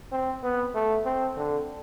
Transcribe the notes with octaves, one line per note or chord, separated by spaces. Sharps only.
C4
B3
A3
C4
D3